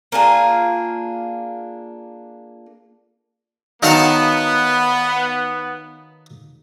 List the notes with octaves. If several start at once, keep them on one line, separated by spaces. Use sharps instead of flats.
A#3 D4 F4 G#4
D#3 F#3 B3 D#4 F#4 F5 A5